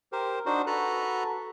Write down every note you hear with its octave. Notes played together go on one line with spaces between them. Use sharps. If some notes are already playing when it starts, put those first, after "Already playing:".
G4 A#4 C5
D4 D#4 F#4 C5
F#4 A4 B4 A#5 F#6